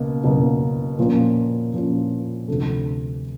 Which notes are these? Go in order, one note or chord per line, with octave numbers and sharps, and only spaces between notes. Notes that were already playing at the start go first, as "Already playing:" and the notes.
Already playing: C#2 B2 A#3
C#2 B2 F#3 A#3 C#4
A#2 F3 A#3 C#4 F4
A#2 F3 A#3 C#4 F4
D2 C3 F3 A3